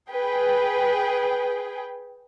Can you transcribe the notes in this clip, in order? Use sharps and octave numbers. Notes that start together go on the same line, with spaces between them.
G#4 B4 G5